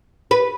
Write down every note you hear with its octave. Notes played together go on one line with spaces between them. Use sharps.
B4